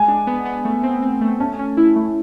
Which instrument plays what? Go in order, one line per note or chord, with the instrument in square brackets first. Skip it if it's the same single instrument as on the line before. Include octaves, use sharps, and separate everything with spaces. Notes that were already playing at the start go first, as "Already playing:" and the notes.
Already playing: [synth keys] G#3 [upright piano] G#5
[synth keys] D4
B3
B3
A3
C4
C4
A3
[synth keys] C#4 [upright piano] A5
[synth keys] C#4
E4
A3